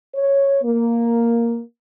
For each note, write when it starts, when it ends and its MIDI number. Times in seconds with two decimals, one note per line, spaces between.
0.15 0.58 73
0.63 1.60 58